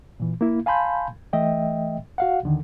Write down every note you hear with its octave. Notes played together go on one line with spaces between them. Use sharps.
A#2 E3
A#3 E4
F5 G#5 A5 B5 C6 G6
E3 A3 D#5 E5 G5
F#4 F5 F#5
D#2 D3 D#3